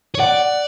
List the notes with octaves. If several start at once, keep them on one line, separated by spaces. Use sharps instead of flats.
C#5
D5 F#5